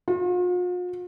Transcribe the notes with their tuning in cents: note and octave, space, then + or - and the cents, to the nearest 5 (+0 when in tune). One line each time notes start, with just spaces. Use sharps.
F4 +45